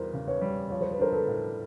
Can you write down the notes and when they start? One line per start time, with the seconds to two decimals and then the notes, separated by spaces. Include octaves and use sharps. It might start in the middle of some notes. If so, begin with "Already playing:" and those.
Already playing: E2 E3 G3 A#4 C5
0.13 C#3
0.27 B4 C#5
0.41 G3
0.70 F3 C#5
0.81 C5
0.91 B4
0.98 D4 A#4 C5
1.13 A4 B4
1.27 A2